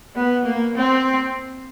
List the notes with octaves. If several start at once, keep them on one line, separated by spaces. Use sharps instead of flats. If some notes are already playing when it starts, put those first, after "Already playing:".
B3
A#3
C4